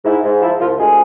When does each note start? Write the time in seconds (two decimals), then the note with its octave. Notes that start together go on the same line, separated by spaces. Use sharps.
0.05 G#2 E4
0.23 G#2
0.41 F3 E4
0.60 C2 F3 F4
0.78 D2 G#3 G#4